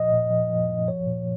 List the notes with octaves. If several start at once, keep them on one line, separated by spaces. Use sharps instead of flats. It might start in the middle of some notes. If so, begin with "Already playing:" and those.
Already playing: A#2 F3 D#5
A#2
F3
F3
F3
F3 C#5
A#2